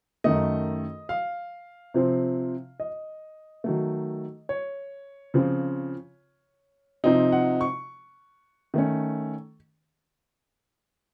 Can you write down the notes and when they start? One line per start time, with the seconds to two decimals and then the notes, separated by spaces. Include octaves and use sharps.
0.24 F#2 D#3 A3 D#5
1.09 F5
1.94 C3 F3 C4
2.80 D#5
3.64 D#3 F#3 A3
4.49 C#5
5.34 C#3 F3 C4 F4
7.04 C3 F3 C4 D#4
7.32 F#5
7.61 C#6
8.74 D#3 A3 C#4